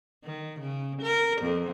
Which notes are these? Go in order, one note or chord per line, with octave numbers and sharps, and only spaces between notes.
D#3
C#3
A#4
F2